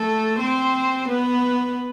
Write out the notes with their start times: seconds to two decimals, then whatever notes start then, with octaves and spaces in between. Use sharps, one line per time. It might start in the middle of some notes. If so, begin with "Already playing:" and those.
Already playing: A3 A4
0.40 C4 C5
1.09 B3 B4